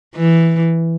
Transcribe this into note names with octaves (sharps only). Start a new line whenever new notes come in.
E3